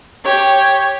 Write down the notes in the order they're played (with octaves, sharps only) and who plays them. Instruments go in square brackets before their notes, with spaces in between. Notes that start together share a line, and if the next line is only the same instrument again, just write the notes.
[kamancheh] G4 C#5